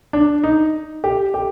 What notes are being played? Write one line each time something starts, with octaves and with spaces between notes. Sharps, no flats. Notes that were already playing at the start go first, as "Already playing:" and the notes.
D4
D#4
G4
G4